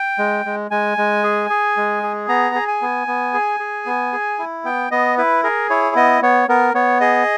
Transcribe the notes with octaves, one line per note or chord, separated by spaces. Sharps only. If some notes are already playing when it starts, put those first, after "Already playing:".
Already playing: G5
G#3
G#3
G#3 G#5
G#3
G#4
G#4
G#3
G#4
B3 A#5
G#4
G#5
B3
B3
G#4
G#4
B3
G#4
E4
B3 G5
B3 D#5
E4 B4
G#4 A#4
E4 C#5
B3 D#5
B3 C#5
B3 A#4
B3 C#5
G#4 D#5